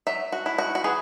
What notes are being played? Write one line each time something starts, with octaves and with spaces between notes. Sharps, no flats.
F#3 E5
F#4
E4
F#4
F#4
E3 G#4